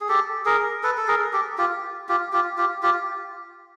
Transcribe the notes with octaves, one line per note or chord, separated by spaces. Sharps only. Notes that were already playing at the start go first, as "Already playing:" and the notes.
G#4
G4 A4
G#4 A#4
A4 B4
A4
G#4 A#4
G4 A4
F4 G4
F4 G4
F4 G4
F4 G4
F4 G4